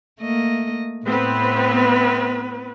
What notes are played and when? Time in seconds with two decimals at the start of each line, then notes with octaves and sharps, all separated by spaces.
0.20 A3 A#3 D#5
1.06 A2 B3 C4 B4